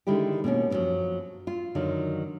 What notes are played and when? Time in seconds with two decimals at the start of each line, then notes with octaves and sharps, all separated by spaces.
0.07 D3 D#3 G#3 E4 G4
0.44 B2 A#3 B3 C#4
0.70 F#2 A#2 D#3 F3 F#3
1.47 F4
1.75 F#2 D3 D#3 F#3